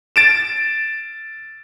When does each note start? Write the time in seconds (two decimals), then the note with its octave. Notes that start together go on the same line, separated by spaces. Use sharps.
0.16 A6 D7 E7